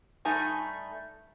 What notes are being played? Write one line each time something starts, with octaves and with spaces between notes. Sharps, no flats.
G2 A3 D#4 G#5 A#5